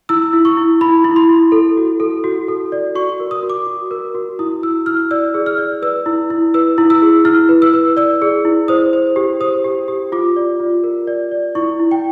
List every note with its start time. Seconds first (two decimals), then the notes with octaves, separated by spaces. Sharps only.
0.09 E4 E6
0.33 E4
0.45 C#6
0.57 E4
0.81 E4 B5
1.04 E4
1.16 C6
1.29 E4
1.52 A4
1.77 F#4
2.00 A4
2.24 F#4
2.48 A4
2.72 D5
2.95 F#4 C#6
3.20 A#4
3.31 D#6
3.43 F#4
3.50 D6
3.67 F#4
3.91 A#4
4.15 F#4
4.39 E4 D#6
4.63 E4 E6
4.86 E4 F6
5.11 D5 E6
5.34 G#4
5.46 F6
5.58 D5
5.82 B4 E6
6.06 E4
6.30 E4
6.54 B4 E6
6.78 E4
6.90 E6
7.02 G#4
7.25 E4 F6
7.49 B4
7.62 E6
7.73 B4
7.97 D5 E6
8.22 G#4
8.45 E4
8.68 C5 D#6
8.93 C5
9.16 G4
9.40 C5 D#6
9.64 G4
9.88 G4
10.12 F4 D6
10.36 D5
10.60 F4
10.84 A#4
11.07 D5
11.31 D5
11.55 E4 C#6
11.79 E4
11.91 G5